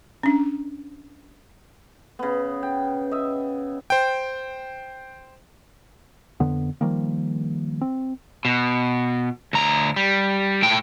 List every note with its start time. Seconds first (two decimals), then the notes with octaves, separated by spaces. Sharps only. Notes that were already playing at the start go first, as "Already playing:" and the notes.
0.23 C#4 D4
2.19 C#3 B3
2.63 G5
3.11 D#5 E5
3.90 C5 G5
6.40 F2 D3 B3
6.81 D#3 F3 G3 A#3
7.81 C4
8.45 B2
9.53 D2 A#5
9.96 G3
10.62 A2 G5